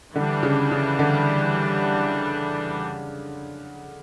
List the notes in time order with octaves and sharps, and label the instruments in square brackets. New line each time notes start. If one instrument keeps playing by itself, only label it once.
[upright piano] D3 [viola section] E3 G3 D4
[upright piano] C#3
C#3
D3